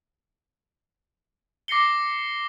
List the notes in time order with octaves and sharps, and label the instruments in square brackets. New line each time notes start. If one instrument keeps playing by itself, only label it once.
[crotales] D6 A#6 C7 C#7 G7